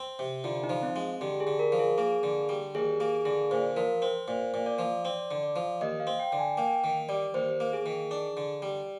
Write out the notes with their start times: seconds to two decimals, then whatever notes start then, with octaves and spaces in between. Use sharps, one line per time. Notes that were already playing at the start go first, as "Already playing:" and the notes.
Already playing: C4
0.19 C3
0.44 D3 F4
0.64 D#4
0.69 F3
0.83 C4
0.96 G#3
1.21 D3 G4
1.40 G#4
1.47 D3
1.59 A#4
1.72 F3
1.79 G#4
1.98 A#3 G#4
2.23 D3
2.49 G3
2.75 D#2 G#4
3.00 A#3 G#4
3.25 D3 G#4
3.51 A#2 C5
3.76 F3 A#4
4.02 C4 C5
4.28 A#2 C5
4.54 A#2
4.66 D5
4.79 F3
5.04 C4 D5
5.31 D3
5.43 D5
5.56 F3
5.81 D#2 D#5
6.00 F5
6.07 C4
6.19 G5
6.32 D3
6.39 G#5
6.57 A#3 G5
6.84 D#3
7.09 G3 D5
7.34 D#2 C5
7.60 A#3
7.73 G#4
7.86 D#3
8.11 D4
8.37 D3
8.62 G3